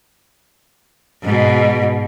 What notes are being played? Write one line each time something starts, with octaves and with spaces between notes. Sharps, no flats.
G#2 B2